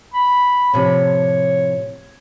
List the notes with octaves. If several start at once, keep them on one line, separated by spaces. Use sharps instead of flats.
B5
A2 C3 F3 C#5